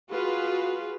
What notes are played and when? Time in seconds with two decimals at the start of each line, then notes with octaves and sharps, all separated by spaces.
0.10 F4 F#4 G#4 B4